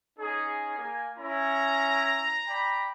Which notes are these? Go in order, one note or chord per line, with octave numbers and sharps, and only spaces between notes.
C#4 D#4 G#4
A#3 G#5
C#4 E4 A#5
D5 G5 B5